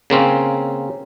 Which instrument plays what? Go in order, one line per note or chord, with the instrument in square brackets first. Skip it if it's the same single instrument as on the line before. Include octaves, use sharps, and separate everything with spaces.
[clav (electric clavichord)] C#3 A#3 C4 C#4